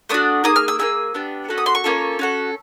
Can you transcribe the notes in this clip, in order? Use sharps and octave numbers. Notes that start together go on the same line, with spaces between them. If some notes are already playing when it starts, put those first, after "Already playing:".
A3 D4 F#4 D#6
A#3 D#4 G#4 D#6
F6
E6
A#3 D#4 G#4 E6
B3 D4 G4
C#4 F#4 A4
D#6
C6
C#6
A#3 C#4 F4 A4
C#4 F#4 A4